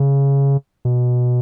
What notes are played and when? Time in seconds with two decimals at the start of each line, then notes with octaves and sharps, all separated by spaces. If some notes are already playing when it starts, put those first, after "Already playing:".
Already playing: C#3
0.85 B2